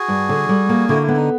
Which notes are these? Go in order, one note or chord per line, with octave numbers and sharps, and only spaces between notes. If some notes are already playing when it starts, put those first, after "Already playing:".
Already playing: F#4 G#4
G2
D3
G3
A#3
D3 E4 F#4
E4
B3
D#4